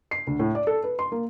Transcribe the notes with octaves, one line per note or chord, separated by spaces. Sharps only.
C7
D2
A2
D5
A4
B4
C6
A#3